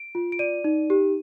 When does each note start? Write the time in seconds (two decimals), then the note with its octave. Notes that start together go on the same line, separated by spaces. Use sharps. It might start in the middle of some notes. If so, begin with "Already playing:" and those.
Already playing: D7
0.15 F4
0.32 D7
0.39 D5 D#7
0.64 D#4
0.90 G4